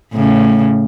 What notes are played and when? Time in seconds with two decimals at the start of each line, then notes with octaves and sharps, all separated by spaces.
0.13 A2 C#3